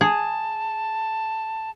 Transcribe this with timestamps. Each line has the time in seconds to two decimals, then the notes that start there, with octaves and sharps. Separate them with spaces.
0.01 G#4 A5